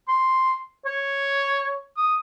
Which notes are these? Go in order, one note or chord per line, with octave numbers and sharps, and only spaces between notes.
C6
C#5
D#6